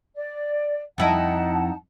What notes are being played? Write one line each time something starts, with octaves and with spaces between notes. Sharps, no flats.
D5
F2 D#4 E4 D#5 F#5 A5